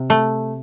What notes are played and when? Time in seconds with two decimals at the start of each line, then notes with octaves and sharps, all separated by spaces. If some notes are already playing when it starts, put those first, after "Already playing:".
Already playing: C3
0.10 A3